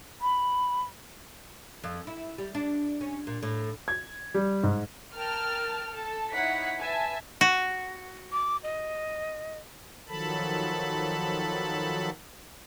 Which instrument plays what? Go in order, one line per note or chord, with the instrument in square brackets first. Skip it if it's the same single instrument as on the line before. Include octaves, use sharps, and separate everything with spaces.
[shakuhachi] B5
[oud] F2
E4
G3
D4
C#4
A#2
A2
[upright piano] G#6
G3
G#2
[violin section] A#4 G5 A5 F6
A4 A5
D#4 E4 C#5 F#5 B6
B4 E5 G#5 A5
[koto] F#4
[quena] D6
D#5
[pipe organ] D#3 F3 F#3 A4 A5 B5